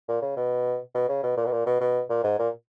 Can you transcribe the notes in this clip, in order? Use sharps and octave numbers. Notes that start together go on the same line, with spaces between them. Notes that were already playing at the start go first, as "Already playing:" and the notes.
A#2
C#3
B2
B2
C#3
B2
A#2
B2
A#2
B2
B2
A#2
G#2
A#2